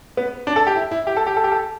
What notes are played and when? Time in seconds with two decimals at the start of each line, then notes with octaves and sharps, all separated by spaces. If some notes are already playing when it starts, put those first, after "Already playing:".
0.17 B3
0.47 D4
0.56 A4
0.67 G4
0.76 E4
0.91 E4
1.07 G4
1.17 A4
1.27 G4
1.37 A4
1.44 G4
1.52 A4